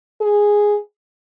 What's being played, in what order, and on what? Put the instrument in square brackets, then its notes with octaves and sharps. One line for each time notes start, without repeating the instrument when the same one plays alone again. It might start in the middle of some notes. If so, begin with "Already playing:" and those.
[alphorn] G#4